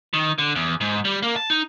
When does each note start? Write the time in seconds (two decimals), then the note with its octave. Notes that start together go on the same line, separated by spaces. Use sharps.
0.13 D#3
0.38 D3
0.55 E2
0.81 G#2
1.05 G3
1.23 A#3
1.36 A5
1.50 D#4